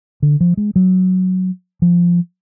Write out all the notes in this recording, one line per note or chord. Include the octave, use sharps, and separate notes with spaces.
D3
F3
G#3
F#3
F3